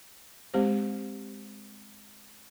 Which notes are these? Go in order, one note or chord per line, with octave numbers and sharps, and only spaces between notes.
G#3 C4 G4 C5